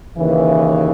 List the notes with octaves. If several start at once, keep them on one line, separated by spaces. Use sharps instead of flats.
D#2 C#3 E3